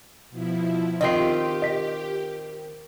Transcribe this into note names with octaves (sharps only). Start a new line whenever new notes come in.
B2 F3 E4
D#3 C4 F4 G4 D#5 C7
D#5 B6